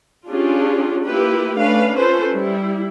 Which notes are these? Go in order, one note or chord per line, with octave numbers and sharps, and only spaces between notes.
C#4 D4 F4 G4 G#4
A#3 E4 F4 G4 B4
A3 C#4 D4 B4 F5
C#4 F4 A4 B4 C5
G3 E4